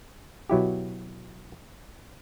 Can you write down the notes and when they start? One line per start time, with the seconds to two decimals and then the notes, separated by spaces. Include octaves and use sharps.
0.50 B2 F#3 E4 G4